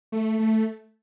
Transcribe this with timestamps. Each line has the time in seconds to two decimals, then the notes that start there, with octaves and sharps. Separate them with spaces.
0.12 A3
0.39 A3